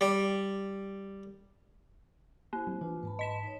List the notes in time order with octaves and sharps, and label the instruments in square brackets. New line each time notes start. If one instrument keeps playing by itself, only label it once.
[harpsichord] G3
[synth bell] A#3 [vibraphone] E4 C5
[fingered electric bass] F#3 C4
[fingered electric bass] E3 [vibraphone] D4 F4 B4
[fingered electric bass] G#2 [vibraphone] B4 A5 B5
[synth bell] D#5 B6 E7
[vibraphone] D#4 C#5